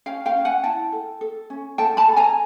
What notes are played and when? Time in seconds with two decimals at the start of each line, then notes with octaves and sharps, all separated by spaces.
0.06 C#4 F5 G5
0.26 F5 G5
0.35 C#4
0.45 F#5 G#5
0.64 E4 G5 A5
0.92 A4
1.21 A4
1.50 C#4
1.78 A4 G5 A5
1.97 A5 B5
2.07 A4
2.17 G#5 A#5